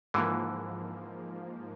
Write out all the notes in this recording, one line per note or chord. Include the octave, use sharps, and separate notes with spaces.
G#2 D3 E3 F3 A#3